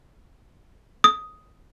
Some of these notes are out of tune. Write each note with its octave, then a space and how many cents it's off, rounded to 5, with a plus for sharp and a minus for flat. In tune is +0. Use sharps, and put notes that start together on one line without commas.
D#6 +5